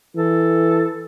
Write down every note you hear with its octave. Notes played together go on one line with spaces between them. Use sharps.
E3 A4